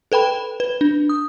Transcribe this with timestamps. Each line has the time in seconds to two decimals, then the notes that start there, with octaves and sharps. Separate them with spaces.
0.12 A4 B4 G5 B5
0.60 B4
0.81 D4
1.09 D#6